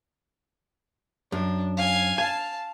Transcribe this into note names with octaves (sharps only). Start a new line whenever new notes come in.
F#2 D4
F5 G#5
F5 G#5 A5